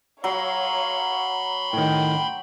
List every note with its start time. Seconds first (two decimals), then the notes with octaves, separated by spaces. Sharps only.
0.24 F#3 C#5 F5 B5 C6
1.73 A2 D#3 G5